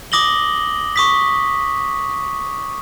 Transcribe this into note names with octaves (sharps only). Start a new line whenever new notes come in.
D6 D#6 A#6 F#7 G7
C#6 D#6 B6